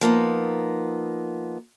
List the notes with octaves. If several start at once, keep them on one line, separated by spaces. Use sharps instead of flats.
F3 A#3 B3 D#4